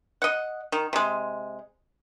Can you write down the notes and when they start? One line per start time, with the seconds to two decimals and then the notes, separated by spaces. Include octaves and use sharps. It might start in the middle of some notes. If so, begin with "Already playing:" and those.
0.22 D#5 F#5
0.72 D#3
0.93 C3 G#3